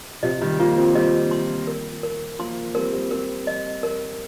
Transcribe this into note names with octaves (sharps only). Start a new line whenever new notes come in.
C3 F3 D#5
D#3 G3
F3 A#3 F4
G3 C4
G3 C4 D#5
C6
A#4
A#4
F3 A#3 C6
G3 C4 A#4
G3 C4
G3 C4 A#4
D#5
A#4